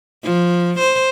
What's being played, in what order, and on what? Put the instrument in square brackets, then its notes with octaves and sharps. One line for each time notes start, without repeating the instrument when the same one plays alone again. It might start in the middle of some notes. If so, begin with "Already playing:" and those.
[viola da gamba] F3
C5